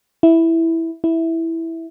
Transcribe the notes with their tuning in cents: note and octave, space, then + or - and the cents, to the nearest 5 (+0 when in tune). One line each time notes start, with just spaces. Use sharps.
E4 -5
E4 -5